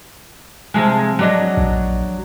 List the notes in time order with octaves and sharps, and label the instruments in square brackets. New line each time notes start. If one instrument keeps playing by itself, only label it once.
[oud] C3 F3 G#3
F#3 D4 D#5
[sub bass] A#1